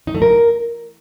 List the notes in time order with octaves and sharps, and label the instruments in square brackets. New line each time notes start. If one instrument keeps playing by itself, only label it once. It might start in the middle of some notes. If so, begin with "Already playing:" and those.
[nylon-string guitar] D#4
A3
A#4